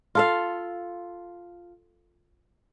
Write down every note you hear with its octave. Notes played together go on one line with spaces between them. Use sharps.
F4 A4 F5